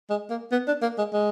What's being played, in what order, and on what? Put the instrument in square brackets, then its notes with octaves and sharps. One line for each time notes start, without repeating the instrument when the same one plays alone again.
[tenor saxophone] G#3
A#3
B3
D4
A#3
G#3
G#3